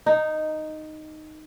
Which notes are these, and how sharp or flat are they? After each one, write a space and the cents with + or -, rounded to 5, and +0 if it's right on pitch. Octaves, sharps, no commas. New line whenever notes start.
D#4 -5